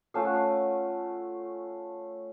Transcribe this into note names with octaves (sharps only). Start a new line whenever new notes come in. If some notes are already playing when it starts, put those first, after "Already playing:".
A3 C#4 F4 F5
F#5
F5